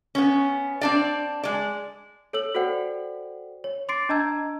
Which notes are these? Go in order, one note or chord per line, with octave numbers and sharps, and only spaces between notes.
B3 C#4
C4 D4 D5
G#3 D5
A4 C#5 E6 F#7
F#4 A4 C5 D5 F#5 G5
C#5
C6 D6 A6 C7 D7
D4 D#5 A5 A#5 E6 G#6